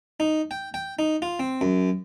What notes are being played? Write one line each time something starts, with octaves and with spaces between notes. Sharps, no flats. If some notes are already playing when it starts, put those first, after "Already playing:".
D#4
G5
G5
D#4
F4
C4
F#2